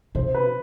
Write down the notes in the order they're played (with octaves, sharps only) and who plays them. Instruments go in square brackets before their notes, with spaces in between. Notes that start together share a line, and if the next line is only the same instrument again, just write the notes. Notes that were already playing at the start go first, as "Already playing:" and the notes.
[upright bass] C3 [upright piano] C5
[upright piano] B4